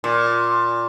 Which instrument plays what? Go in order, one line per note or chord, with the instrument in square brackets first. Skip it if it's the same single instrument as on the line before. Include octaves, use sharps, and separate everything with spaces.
[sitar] A#2